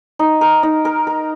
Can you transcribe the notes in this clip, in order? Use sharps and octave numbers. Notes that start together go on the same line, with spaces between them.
D#4
A#4
D#4
A#4
A#4